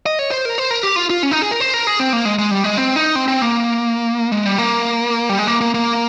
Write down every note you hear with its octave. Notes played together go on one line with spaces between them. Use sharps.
D#5
C#5
C5
A#4
C5
A#4
G4
F4
F4
C#4
D#4
G#4
A#4
C5
A#4
G#4
C4
A#3
G#3
G#3
G3
G#3
C4
D#4
C4
C4
A#3
G#3
G3
A#3
G3
G#3
A#3
A#3
A#3